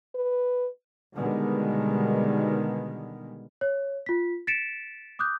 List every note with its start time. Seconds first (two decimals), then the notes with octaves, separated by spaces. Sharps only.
0.15 B4
1.16 B2 D3 D#3 G3 G#3 B3
3.61 C#5
4.06 F4 B6
4.47 A6 B6 C#7 D7 E7
5.19 D6 D#6 F#6 G6